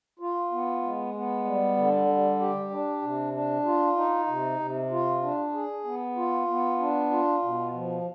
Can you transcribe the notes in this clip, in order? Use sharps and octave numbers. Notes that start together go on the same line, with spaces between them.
F4
B3
G#3
B3
G3
D3
G3
G4
D4
C3
D4
F4
D#4
C3
C3
F4
D4
G#4
B3
F4
B3
D4
F4
B2
F3